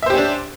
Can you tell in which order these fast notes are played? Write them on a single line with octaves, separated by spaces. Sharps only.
E5 C5 G4 C#4 D4